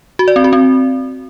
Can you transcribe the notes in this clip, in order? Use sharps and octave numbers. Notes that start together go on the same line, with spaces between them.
F#4
D5
C4
F#4
C4